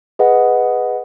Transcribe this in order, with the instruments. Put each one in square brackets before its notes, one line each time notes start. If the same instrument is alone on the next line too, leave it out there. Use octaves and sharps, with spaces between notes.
[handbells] G#4 B4 D#5 F#5